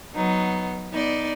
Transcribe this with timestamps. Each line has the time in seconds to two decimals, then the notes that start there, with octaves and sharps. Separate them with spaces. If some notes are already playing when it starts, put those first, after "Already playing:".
0.14 F#3 B3 D#4
0.91 B3 D#4 D5